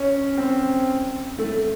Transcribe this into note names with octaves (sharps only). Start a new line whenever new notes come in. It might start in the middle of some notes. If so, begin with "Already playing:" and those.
Already playing: C#4
C4
A3